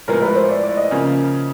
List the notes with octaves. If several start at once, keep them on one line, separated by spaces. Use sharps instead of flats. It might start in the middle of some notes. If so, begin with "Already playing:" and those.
A2 F3 G#3 B3 A#4
B4
C5
D5
D5
D#5
C#3 F3 A#3 C#4